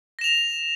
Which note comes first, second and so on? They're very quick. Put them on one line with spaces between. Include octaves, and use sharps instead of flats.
A#6 E7 F7